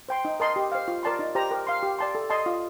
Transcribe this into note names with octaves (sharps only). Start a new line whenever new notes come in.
C5 G5 C6
D#4
A#4 D#5 A5 C6
G4
C5 F5
F4
A#4 D5 A5 C6
D#4
G4 C5 G5 A#5
A#4
F5 C6
G4
D5 A5 C6
A4
D#5 A5 C6
F4